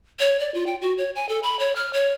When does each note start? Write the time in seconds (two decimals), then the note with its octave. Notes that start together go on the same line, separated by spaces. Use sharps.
0.20 C#5
0.40 D5
0.54 F4
0.67 G5
0.81 F#4
0.98 C#5
1.15 G#5
1.29 A4
1.43 B5
1.59 C#5
1.76 F6
1.93 C#5